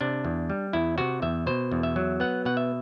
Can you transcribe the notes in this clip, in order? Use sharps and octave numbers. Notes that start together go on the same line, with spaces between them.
C3 D4
E2
G3
E2 E4
C3 F#4
E2 E5
B2 C5
E2
E5
F#3
B3 F#5
B2 F#5
E5